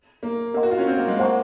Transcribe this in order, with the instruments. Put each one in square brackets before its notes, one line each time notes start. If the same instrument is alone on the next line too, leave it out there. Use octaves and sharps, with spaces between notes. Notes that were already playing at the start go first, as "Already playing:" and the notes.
[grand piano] A#3
[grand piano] A#3 [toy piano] A#4 D#5 F#5 C6
[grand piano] F#4
F4
C#4
C4
A#3
G#3
[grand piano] A#3 [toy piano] C5 F#5 A#5 C#6